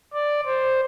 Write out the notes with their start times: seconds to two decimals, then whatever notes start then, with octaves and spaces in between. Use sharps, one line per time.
0.14 D5
0.46 C5